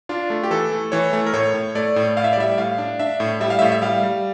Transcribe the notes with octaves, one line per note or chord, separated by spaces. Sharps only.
D4 F4
A3
G4
E3 A4
A3
E3 C#5
A3
A#4
A2 C#5
A2
A3 D5
A2
A2 F5
E5
D5
G3 E5
A2 F5
D4
D4 E5
A2
G3 E5
F5
A2 E5
E5
G3 F5
G3